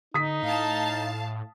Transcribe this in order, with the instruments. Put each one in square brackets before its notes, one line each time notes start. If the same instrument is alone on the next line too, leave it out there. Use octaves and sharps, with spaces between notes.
[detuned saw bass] D3 [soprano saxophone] D#4 [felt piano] D#6 B6
[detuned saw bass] A2 [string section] F5 A5